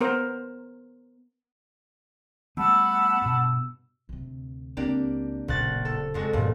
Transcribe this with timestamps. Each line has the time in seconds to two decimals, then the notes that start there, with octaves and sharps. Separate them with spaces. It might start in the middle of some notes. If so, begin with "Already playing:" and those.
0.01 B3 A#4 C5
2.57 G3 A3 B3 F#5 A5 B5 E6
3.22 G2 B2
4.09 D2 C3
4.77 C#2 A#3 C4 D4 G4
5.48 D1 A#1 C#3 F#6 A6
5.85 A4
6.14 F2 G#3 F#4
6.33 E2 G2 A#2